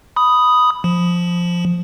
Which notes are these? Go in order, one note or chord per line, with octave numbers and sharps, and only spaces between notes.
B5 D#6
F3